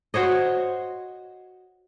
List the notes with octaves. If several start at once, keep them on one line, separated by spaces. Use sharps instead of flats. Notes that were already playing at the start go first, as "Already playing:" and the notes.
F#4 C5 C#5 D#5